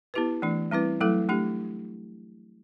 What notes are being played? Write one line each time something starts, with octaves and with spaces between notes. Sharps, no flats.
B3 E4 G4 B4
E3 A3 D4
G3 C4 E4 B4
F#3 A3 E4 A4
A3 D4 G4